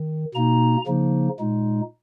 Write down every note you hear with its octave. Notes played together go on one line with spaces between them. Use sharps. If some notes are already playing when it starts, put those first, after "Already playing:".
Already playing: D#3
B2 A#3 D#4 A#5
C#3 F3 A#3 D#4
A#2 G#3 D#4